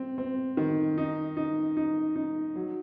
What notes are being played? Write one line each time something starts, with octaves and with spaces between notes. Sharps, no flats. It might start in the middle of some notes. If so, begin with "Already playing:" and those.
Already playing: C4
C4
D#3
D#4
D#4
D#4
D#4
F#3